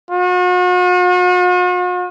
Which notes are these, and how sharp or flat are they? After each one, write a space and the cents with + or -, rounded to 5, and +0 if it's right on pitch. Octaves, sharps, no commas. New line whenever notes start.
F#4 -45